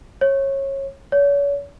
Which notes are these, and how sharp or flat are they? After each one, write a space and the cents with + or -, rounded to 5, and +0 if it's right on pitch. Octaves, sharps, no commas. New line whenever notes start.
C#5 -20
C#5 +40